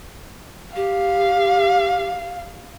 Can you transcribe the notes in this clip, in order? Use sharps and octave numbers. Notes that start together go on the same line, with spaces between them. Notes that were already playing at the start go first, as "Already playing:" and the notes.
G4 F5